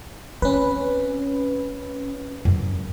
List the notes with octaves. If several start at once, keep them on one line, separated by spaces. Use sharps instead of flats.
C4 C#4 B4
F#2